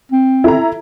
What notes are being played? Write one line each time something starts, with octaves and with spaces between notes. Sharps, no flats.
C4
E4 A4 A#5